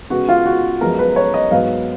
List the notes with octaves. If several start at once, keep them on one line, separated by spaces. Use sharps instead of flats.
C#3 G#3 B3 F#4
F4
F#4
F#2 F3 G#3 B3 A#4
B4
C#5
D#5
G#2 F#3 B3 F5